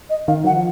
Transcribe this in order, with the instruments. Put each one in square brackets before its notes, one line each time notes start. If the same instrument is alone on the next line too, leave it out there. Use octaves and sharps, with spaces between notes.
[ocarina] D#5
[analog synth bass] D#3 [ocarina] F5
[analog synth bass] F#3 [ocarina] F#5
[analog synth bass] F3